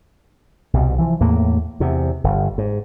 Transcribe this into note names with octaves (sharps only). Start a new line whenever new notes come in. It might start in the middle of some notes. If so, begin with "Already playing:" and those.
C2 B2
E3 F3
E2 A2 A#3
E2 C3
G1
G#2